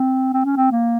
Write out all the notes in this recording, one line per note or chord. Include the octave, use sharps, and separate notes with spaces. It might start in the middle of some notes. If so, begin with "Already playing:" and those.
Already playing: C4
C4
C#4
C4
A#3